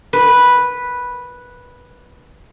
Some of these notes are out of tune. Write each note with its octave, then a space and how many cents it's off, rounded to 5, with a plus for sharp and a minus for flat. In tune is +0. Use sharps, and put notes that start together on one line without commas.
B4 -5